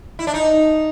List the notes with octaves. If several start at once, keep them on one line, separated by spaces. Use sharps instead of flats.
E4
D4
D#4